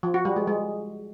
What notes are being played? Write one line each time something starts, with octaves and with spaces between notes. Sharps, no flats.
F3
F#4
G3
G#3
G#3